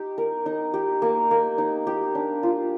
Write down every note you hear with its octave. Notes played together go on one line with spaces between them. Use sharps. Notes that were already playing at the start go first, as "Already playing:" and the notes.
Already playing: D#4 G4
A#4
D#4
G4
A#3
A#3
D#4
G4
D4
F4